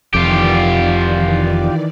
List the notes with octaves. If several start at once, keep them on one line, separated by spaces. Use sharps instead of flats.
F1 F2 D#3 E3 F4 G4 D5